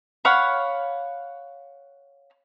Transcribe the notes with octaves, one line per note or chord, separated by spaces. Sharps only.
C#5 F5 F#5 B5